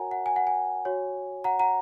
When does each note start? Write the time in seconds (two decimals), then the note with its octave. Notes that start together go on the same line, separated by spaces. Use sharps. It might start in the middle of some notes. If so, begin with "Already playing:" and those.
Already playing: F#4 A#4 C#5 F#5 G#5 A#5
0.11 F#5
0.26 G#5
0.36 F#5
0.47 G#5
0.85 F#4 C#5
1.44 F#5 A#5
1.60 F#5 A#5